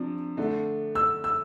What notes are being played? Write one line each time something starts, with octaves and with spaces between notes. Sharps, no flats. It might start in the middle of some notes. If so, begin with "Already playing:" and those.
Already playing: C3 F3 D4
D3 A3 D4
E6
E6